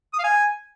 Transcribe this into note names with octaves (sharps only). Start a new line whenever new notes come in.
D#6
F5
G#5